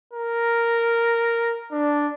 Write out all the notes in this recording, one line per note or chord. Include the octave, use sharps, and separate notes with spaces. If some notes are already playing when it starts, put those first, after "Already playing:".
A#4
D4